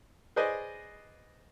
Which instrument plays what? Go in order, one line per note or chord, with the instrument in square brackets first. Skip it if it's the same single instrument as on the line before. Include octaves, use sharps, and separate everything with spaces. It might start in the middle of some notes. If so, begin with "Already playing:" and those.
[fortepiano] G#4 B4 C5 D5 D#5 G#5